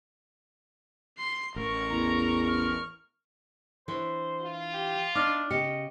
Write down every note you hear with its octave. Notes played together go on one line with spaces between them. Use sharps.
C6 C7
A1 A#4 C#6
E2 A#5
F6
E3 D4 C5 C#5
F4
G4
D4 D#4 D6 F6
C#3 G4 D#5 C#7